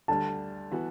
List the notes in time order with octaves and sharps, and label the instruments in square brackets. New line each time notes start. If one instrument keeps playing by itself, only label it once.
[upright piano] D2 D3 G3 [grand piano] A5
[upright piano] E3 B3 F#4